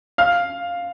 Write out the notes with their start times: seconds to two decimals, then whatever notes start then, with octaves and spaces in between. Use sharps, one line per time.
0.18 F5 F6